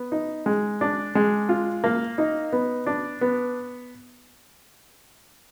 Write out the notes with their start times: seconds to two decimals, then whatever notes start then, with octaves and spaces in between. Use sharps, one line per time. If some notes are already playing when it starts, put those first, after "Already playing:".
Already playing: B3
0.12 D#4
0.46 G#3
0.81 D4
1.15 G#3
1.49 F4
1.84 A#3
2.18 D#4
2.52 B3
2.86 D4
3.21 B3